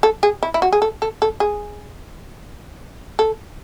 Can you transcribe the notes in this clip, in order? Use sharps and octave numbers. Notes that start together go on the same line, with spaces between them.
A4
G#4
E4
E4
F#4
G#4
A4
A4
A4
G#4
A4